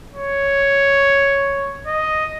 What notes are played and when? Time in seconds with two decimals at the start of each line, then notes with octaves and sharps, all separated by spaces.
0.12 C#5
1.87 D#5